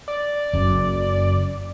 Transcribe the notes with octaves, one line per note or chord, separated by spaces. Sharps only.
D5
F#1 F#2